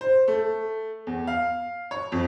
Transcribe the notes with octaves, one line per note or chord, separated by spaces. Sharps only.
C5
A3
E2
F5
C#5
F2